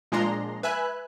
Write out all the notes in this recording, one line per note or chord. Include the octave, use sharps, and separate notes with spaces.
A#2 F3 G#3 D4 A#5 C6
B4 E5 G#5 F#6